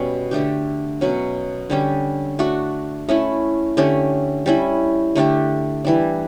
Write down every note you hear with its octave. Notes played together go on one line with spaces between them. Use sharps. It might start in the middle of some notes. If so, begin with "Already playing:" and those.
Already playing: B2 G3 C#4
D3 A3 D4 G4
B2 F#3 C#4
D3 G3 C#4 G4
A3 D4 F#4
A3 C#4 E4
D3 A3 C#4 G4
G3 C#4 E4
D3 A3 D4 G4
E3 G3 D4